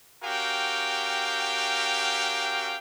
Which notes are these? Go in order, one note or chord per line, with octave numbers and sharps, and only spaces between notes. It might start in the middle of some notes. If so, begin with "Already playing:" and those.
C#4 F#4 G4 A#4 F5 G5